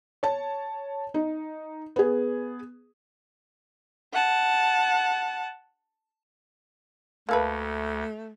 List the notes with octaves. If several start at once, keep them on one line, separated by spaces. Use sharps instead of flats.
C#5 A5
D#4
B3 G#4
F#5 A5
D2 A3 A#3 A4 B4